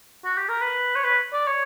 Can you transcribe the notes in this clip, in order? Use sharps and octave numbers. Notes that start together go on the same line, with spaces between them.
F#4
G4
A#4
B4
C#5
B4
D5
C#5